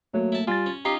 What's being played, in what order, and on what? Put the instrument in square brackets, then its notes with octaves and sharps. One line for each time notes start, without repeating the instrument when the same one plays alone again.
[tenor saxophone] F#3 [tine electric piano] A3 A#3
[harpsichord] E4 A5
[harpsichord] G3 [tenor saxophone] F4 [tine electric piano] G#5 A6
[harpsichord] C#4
[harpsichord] C#4 D#4 F4 [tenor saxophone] G4 [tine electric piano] A#5 C7